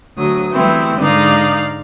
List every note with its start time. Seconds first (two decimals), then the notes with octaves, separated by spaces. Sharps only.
0.17 D2 F#3 D#6
0.51 E3 G3 A3 B3 C4 E4
0.97 G#2 D3 G#3 D#4 D5 F5